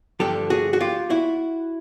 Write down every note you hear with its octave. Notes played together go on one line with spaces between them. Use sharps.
G2 D3 F3 G4 A4
F#4 G#4
F#4
F4 G4
E4 F#4